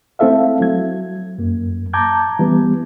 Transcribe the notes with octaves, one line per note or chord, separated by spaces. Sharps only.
A3 C4 E4 A4 E5 F5
F#3 G#6
F#2 A#3
A5 A#5 D6 G6 G#6
E3 G3 B3